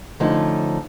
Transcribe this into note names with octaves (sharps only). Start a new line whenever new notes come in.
D3 F3 A3 C#4 D#4